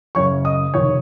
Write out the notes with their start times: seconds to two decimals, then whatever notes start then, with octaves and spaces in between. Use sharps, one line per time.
0.15 F#1 F#2 C#3 C#5 C#6
0.45 D#5 D#6
0.74 F1 D#2 D#3 C#5 C#6